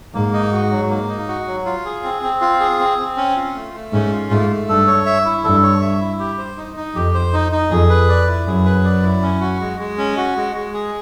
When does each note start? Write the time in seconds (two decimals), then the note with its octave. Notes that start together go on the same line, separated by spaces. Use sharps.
0.14 G#2 A#3
0.33 D#4
0.53 F#4
0.71 F#3
0.90 A#3
1.09 D#4
1.28 F#4
1.47 F#3
1.65 F4
1.85 G#4
2.03 C4
2.23 C4
2.41 F4
2.60 G#4
2.79 C4
2.98 C4
3.17 C#4
3.36 F4
3.55 A3
3.74 A3
3.93 G#2 C#4
4.12 F4
4.31 G#2 A3
4.50 A3
4.69 G2 A4
4.87 C#5
5.06 E5
5.25 E4
5.44 G2 A4
5.63 C#5
5.82 E5
6.01 E4
6.20 G4
6.38 C5
6.57 D#4
6.77 D#4
6.95 F2 G4
7.14 C5
7.33 D#4
7.52 D#4
7.71 F2 G#4
7.90 B4
8.09 D5
8.27 E4
8.46 F#2 G#4
8.65 B4
8.84 D5
9.04 E4
9.22 C#4
9.41 F#4
9.60 G#3
9.79 G#3
9.98 C#4
10.17 F#4
10.36 G#3
10.55 G#3
10.73 G#4